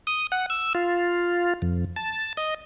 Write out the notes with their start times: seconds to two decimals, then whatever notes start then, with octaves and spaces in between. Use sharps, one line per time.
0.07 D#6
0.32 F#5
0.50 E6
0.75 F4
1.62 F2
1.96 A5
2.37 D#5